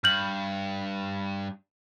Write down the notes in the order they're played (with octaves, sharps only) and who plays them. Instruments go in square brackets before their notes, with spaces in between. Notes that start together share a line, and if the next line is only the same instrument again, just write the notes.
[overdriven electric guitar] G2 [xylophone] F6 G6 F#7